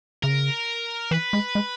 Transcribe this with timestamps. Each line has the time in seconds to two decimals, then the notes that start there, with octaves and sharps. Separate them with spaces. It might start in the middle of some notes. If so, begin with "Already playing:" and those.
0.23 C#3 A#4
1.11 E3 B4
1.33 G#3
1.55 G#3